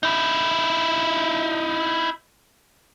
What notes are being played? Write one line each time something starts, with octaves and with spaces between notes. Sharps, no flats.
D#4 E4